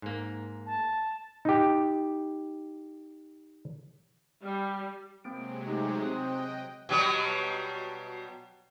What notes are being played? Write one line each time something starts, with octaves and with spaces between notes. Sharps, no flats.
G#2 A#3
A5
D#4 G4
G3
C3 F#3 G#3 A#3 C4 D7
A3 D#4 G4
C4 D#5 G5 D#6 F#6
F#6
B2 F#3 G3